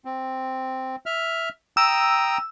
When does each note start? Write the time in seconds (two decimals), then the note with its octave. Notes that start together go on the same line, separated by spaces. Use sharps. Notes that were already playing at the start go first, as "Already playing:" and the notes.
0.05 C4
1.06 E5 F6
1.77 G5 A#5 D#6 E6